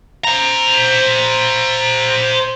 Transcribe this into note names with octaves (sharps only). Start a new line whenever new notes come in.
C5 A#5